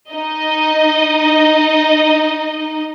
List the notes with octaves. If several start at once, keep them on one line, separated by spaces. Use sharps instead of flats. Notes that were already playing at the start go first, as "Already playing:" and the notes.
D#4 D#5